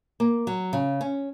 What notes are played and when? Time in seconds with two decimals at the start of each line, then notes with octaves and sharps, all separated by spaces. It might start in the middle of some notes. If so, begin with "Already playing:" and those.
0.20 A#3
0.47 F#3
0.73 C#3
1.01 C#4